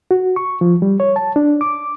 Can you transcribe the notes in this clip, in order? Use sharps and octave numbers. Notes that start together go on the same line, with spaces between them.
F#4
C#6
F3
G3
C#5
A5
D4
D6